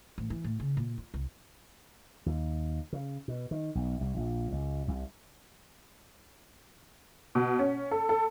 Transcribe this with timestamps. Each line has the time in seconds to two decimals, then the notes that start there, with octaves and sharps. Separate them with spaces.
0.18 A1
0.30 E3
0.44 A2
0.60 C#3
0.77 A#2
0.98 F4
1.14 C2
2.26 D#2
2.93 C#3
3.28 B2
3.51 D#3
3.75 B1
4.01 C2
4.17 A#1
4.52 C#2
4.88 C2
7.35 B2
7.59 C#4
7.91 A4
8.09 A4